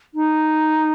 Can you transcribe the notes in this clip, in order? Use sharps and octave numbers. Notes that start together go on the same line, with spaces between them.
D#4